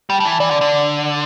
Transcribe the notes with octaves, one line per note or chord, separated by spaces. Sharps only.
G3 G5
G3 A5
E3
A5
E3 D5
D3
D3